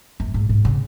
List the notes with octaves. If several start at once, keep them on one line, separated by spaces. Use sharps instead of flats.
F#2
G#2
G#2
C#3